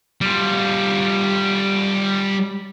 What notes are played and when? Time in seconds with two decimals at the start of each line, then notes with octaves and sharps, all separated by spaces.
0.21 G3 F4